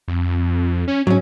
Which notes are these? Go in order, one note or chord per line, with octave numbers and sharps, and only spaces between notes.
F2
C#4
G#2 F#3 C#4